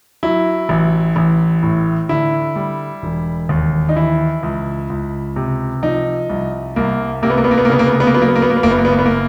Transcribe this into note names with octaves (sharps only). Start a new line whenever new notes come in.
F#3 E4
A1
A1
A2
D3 E4
G3
E1
D#2
D#4
E3 E4
C#2
C#2
C3
F3 D#4
C2
C2 A#3
C3 A#3
B3
A#3
B3
A#3
B3
A#3
C#3 B3
A#3
B3
A#3
B3
A#3
F#3 B3
A#3
B3
A#3
B3
A#3
B3
F#1 A#3
B3
A#3
B3
A#3
B3
A#3